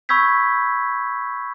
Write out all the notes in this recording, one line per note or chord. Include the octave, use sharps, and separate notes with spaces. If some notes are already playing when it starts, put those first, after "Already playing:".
B5 C#6 E6 G6 G#6 B6